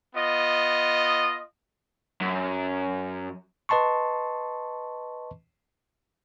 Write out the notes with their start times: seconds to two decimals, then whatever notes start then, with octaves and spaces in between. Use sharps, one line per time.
0.15 B3 F4 D#5
2.21 F#2
3.69 B4 D#5 A5 C6 C#6